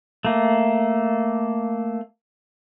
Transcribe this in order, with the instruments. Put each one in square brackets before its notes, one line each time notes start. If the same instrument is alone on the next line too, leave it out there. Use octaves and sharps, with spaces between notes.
[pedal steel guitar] A3 A#3